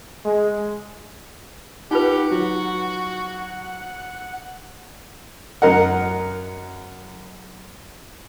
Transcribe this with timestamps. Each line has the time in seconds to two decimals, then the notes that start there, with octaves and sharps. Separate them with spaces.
0.25 G#3
1.91 D#4 F4 G4 B4 F#5
2.31 F#3 F#4
5.62 F#2 A#4 D#5 F#5